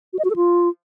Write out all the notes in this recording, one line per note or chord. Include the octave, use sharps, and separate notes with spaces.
F#4
D#5
F#4
A4
F4